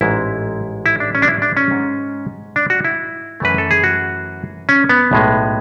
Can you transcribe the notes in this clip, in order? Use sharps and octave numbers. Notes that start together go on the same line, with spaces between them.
A1 G#2 G#3 E4
E4
D4
C#4
D4
E4
D4
C#4
G#2 G#3
D4
F#4
E4
F#2 E3 A3 B4
A4
G#4
F#4
C#4
B3
B1 A2 G#3